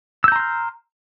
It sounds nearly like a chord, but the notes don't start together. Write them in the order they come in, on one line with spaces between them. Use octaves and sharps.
E6 G6 A#5 C6 F6